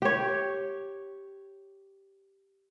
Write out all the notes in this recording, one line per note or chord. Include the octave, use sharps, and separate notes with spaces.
G4 C#5